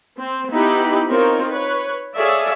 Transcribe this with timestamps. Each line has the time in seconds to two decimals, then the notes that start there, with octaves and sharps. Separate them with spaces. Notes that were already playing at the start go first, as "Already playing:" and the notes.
0.19 C4
0.51 B3 D#4 E4 G4 B5
1.09 C4 D#4 F4 A#4 C#5
1.50 B4 C#5
2.14 G#4 A4 C#5 D5 E5 F5